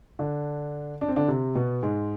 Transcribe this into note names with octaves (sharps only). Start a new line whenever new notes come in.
D3 D4
D4
C4
D3 D4
C3 C4
B2 B3
G#2 G#3